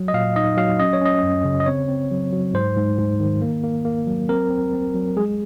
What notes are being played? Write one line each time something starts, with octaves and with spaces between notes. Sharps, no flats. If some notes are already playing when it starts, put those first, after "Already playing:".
Already playing: F#3
D#5
A#2 F5
D#4 D#5
F#3 F5
C#4 D#5
C#5
C#4 D#5
F#2
C#3
D#5
C4 C#5
C4
F#3
F#3
G#2 C5
G#2
G#2
D#3
A#3
A#3
A#3
F#3
C4 A#4
C4
C4
F#3
G#3 G#4